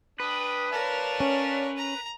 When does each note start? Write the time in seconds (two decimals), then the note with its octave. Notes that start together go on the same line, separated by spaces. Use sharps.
0.20 D4 B4 G5 D#6
0.72 A#4 C#5 D5 F5 A5
1.20 C#4
1.76 A#5